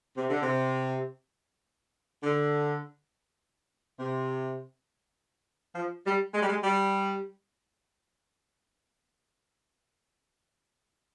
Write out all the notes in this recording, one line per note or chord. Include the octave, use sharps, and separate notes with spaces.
C3
D3
C3
D3
C3
F3
G3
G#3
G3
G#3
G3